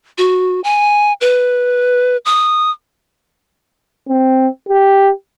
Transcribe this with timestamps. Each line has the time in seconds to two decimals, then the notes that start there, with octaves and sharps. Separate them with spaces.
0.18 F#4
0.64 G#5
1.21 B4
2.25 D#6
4.09 C4
4.69 G4